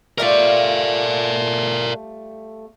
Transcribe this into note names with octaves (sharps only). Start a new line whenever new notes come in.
G3 A3 F4 A#4 D5